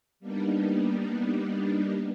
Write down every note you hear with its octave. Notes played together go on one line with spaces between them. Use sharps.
G3 A#3 B3 D4 D#4